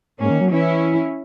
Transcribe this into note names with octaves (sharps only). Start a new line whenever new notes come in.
G#2 A#3 C#4
D#3
F#3
E3 C#4 E4